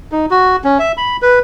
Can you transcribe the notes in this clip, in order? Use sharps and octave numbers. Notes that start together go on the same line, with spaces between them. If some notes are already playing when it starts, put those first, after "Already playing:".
D#4
F#4
C#4
E5
B5
B4